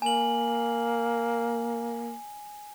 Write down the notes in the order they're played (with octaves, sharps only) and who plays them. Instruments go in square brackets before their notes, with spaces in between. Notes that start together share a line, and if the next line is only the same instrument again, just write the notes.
[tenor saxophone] A#3 [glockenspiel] G#5 F#7